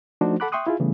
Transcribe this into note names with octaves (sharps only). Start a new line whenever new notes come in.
F3 A3 D4 D#4 F#4 C5
A4 F#5 B5 D6 F#6
E5 G5 C6 C#6 D#6 F#6
E4 F4 G#4
C#3 E3 G3 A3 B3